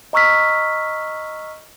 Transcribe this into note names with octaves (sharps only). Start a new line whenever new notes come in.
D#5 A#5 C#6 E6 F6 B6